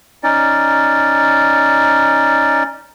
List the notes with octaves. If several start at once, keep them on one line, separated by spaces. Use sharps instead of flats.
C#4 D#4 D5